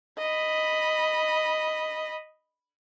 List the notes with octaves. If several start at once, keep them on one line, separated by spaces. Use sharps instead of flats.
D#5 B5